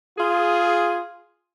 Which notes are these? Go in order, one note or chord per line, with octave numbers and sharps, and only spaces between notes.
F4 G#4